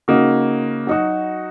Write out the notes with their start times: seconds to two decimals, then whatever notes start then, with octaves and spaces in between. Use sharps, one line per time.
0.08 C#3 A#3 D#4 F#4
0.87 F#3 D#4 F#4